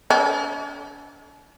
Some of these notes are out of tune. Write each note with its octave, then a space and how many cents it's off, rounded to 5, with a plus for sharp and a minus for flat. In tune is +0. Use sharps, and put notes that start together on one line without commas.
D4 -45